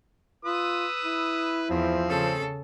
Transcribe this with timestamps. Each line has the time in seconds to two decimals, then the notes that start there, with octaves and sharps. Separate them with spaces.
0.45 F4 B4 D#6 E6
1.04 E4
1.70 E2 F3 C4
2.07 C#3 A4